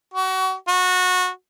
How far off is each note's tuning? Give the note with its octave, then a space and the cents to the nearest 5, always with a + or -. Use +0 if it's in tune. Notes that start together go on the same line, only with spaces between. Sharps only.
F#4 +30
F#4 -20